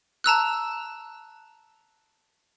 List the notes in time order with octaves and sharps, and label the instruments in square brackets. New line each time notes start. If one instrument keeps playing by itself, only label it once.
[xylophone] A5 A#5 E6 F#6